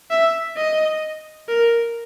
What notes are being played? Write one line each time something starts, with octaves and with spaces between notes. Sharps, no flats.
E5
D#5
A#4